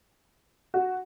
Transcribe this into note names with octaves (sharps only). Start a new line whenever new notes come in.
F#4